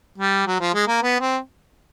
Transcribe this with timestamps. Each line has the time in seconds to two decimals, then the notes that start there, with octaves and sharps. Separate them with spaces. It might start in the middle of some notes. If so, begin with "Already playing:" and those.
0.18 G3
0.47 F#3
0.60 F3
0.74 G#3
0.88 A#3
1.03 B3
1.21 C4